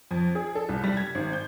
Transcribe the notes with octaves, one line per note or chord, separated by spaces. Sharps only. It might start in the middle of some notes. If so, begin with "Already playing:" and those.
F2
G#4
A4
C2
G3
G#6
G#1
G6